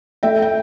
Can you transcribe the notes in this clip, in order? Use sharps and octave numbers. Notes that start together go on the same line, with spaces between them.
A3 E5 G5
G5